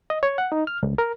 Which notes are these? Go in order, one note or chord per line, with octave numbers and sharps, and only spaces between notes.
D#5
C#5
F#5
D#4
F6
C#2
A#4